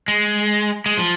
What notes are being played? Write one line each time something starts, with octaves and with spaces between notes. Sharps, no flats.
G#3
G#3
F3